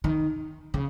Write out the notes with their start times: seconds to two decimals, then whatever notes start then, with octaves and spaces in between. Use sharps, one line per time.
0.04 D#3
0.74 C#3